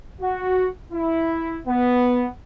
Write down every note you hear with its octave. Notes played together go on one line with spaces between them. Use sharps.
F#4
E4
B3